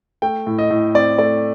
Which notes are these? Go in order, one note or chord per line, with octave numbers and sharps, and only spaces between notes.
A3 G5
A2
D#5
A2
C4 D5
A3 D5